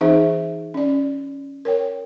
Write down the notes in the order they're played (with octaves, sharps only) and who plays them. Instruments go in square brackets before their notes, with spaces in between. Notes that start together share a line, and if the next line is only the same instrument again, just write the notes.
[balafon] E3 C4 D#4 G#4 C5 E5
C#4 D5
A#4 C#5 G5